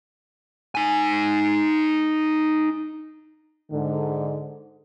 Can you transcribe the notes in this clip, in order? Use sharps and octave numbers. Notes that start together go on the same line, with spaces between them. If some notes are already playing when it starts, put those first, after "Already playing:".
D#4 G#5
G#2 D3